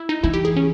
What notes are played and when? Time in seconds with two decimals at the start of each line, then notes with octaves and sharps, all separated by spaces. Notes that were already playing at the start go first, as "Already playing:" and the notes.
Already playing: E4
0.09 D#4
0.23 E3 E4
0.34 G4
0.45 G#4
0.57 C#4